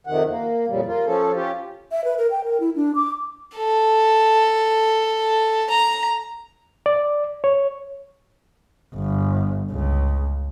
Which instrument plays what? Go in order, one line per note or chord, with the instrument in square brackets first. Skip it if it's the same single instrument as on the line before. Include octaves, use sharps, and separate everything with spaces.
[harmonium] F2 C3 D#3 F#5
A#3
F2 A#2 C#3 G3
A#3 F4
F3 C#4 A4
C#4 F4 G4
[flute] E5
B4
A#4
G5
A#4
E4
D4
D6
[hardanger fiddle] A4
A#5
[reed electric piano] D5
C#5
[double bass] G1
C#2